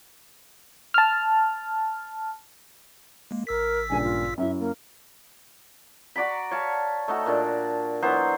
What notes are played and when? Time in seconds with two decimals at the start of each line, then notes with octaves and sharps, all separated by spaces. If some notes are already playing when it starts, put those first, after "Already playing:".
0.94 A5 F6
3.31 G#3 A#3
3.47 A1 A#4 E6 B6
3.90 C#2 G2 A#2 G#5
4.02 F4
4.38 F#2 E4 E5
4.59 A#3
6.16 F#4 D5 A#5 B5
6.51 C#5 F5 A5
7.08 A3 D#4 F#4
7.26 A#2 D4 A5
8.02 E3 F#3 B3 C5